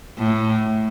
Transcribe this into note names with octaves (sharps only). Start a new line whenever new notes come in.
A2